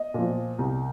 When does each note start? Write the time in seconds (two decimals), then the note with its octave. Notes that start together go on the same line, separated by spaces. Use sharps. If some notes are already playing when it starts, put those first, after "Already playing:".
Already playing: D#5
0.14 A#2 F3
0.59 C2